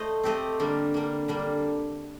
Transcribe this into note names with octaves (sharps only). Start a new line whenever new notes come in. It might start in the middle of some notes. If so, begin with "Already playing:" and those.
Already playing: A3 C5 D#5
A3 C4 G4 C5 D#5
D3 G3 A#3
D3 G3 A#3
D3 G3 A#3